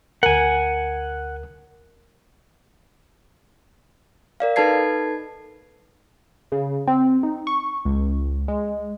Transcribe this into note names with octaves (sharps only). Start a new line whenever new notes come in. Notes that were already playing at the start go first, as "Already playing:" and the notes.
D2 A#4 F#5 G#5
A#4 D5 F5
D#4 A4 B4 A5 G#6 C7
C#3
C4
D#4
C#6
C#2
G#3